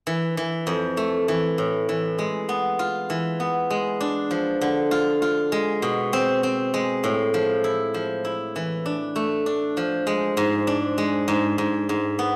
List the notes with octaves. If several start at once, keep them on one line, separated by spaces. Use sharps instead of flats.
E3
E3
F2
A3
E3
A2
E3
G#3
B3
F4
E3
B3
G#3
D4
F3
D3
F4
F4
G#3
B2
C4
C4
G#3
A2
F3
E4
F3
E4
E3
D4
A3
D4
F3
G#3
G#2
D4
G#3
G#2
G#2
G#2
B3